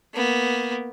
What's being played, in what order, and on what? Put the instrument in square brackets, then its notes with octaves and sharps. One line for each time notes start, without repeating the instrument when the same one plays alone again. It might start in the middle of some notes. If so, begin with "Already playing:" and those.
[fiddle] A#3 B3